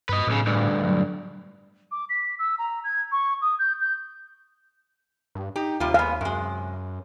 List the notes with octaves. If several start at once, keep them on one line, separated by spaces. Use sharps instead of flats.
G2 B4 D#5
B1 A2 C#3
D2 G2
F#3
D6
B6
E6
A#5
G#6
C#6
D#6
G6
G6
G2
D#4 G4
D#2 C3 G3 F4
G#3 B3 F5
F#2 C3 G#3